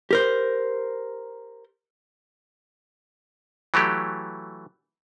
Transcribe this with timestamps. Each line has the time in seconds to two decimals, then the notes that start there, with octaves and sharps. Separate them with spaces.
0.11 G4 A#4 C5
3.74 E3 F#3 A3 G4